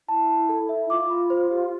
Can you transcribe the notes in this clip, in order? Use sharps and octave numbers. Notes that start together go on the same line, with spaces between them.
E4 A5
A5
A4
E5
F4 D6
B5
C5
G4